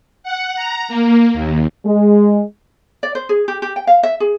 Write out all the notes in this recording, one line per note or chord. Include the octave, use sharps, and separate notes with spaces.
F#5
A#5
A#3
D#2
G#3
D5
C5
G#4
G4
G4
G5
F5
E5
G#4